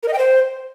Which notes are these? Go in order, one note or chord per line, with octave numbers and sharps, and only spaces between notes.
A#4
D#5
G5
C5